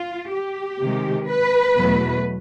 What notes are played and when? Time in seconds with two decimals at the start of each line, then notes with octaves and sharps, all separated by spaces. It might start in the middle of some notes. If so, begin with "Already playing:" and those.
Already playing: F4
0.33 G4
0.81 C3 D#3 G#3
1.28 B4
1.76 E2 B2 F#3 A3